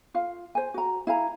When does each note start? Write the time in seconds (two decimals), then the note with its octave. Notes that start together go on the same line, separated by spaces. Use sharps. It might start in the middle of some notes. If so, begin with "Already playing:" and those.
0.14 F4 F5
0.55 C5 G#5
0.74 F#4 A#5
1.07 E4 F5 G#5 A#5